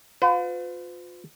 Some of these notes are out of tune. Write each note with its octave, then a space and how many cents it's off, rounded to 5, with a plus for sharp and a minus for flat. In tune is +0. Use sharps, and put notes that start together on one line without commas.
F4 +30 B4 +45 G5 -45